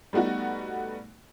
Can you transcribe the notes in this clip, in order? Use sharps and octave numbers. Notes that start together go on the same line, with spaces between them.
G3 A3 B3 D#4 F#4